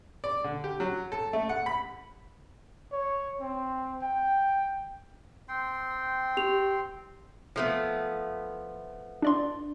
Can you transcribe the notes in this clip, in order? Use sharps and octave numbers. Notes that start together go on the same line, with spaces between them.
D5
D3
G4
F#3
A4
A3
F#5
B5
C#5
C4
G5
C4 G5 C6
G4 F7
F3 A3 B3
D4 D5 C6